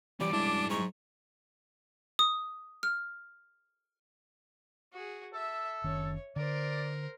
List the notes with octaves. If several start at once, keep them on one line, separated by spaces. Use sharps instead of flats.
G2 E3 C#4 G4 D5 D6
G#3 D4 E4
G#2 C#6
D#6
F6
F#4 G#4
A4 E5
F#1 D#3 C#4 C#5
D3 A#4 C5 D5